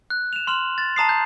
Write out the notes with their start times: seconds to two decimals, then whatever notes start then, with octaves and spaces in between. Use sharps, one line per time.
0.10 F#6
0.33 E7 F7
0.47 C6 F6 E7 F#7
0.78 A6
0.96 A5 A#5 D#6 C7
1.09 G6